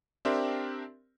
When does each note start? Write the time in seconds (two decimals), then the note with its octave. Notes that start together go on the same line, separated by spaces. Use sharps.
0.25 C4 D4 G4 A#4 E5 C6